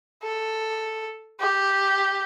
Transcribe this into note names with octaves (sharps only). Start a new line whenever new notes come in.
A4
G4